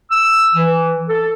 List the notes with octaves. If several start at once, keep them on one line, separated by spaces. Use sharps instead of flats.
E6
E3
A4